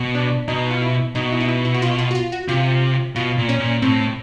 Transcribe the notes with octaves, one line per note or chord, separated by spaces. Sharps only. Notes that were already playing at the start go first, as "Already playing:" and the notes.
Already playing: B2
D4
B2 D#4
F4
E4
B2 D#4
E4
D#4
E4
E4
F#4
F4
F4
F#4
F4
F#4
C3 F4
B2 F4
A#2
C#4
A#2
A2 C4